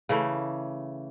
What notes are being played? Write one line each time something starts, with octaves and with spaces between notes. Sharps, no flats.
C#3 E3 A3